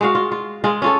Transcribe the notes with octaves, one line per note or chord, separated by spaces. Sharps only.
G#3 F#4 F5
F4
F4
G#3 F4
C#4 F4 A4